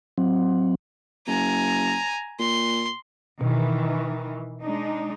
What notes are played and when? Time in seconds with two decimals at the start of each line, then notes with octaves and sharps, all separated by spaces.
0.18 F#3 C4
1.27 F#1 G#5 A#5
2.39 A#2 C6
3.41 B2 D#3 E3
4.62 G#3 D4 D#4